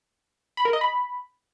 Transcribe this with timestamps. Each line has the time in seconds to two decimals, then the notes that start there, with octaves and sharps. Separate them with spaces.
0.57 B5
0.65 A#4
0.73 D#5
0.81 B5